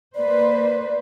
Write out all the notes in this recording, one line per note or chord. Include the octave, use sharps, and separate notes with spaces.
A#3 B4 C5 D5